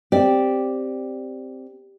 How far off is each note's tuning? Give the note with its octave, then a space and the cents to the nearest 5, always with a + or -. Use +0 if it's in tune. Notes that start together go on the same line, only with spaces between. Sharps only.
C4 +0 G4 +0 D5 +0